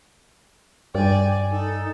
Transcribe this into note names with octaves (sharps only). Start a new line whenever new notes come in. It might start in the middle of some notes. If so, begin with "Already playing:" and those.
G2 D5 G5 G#5
D#4 A4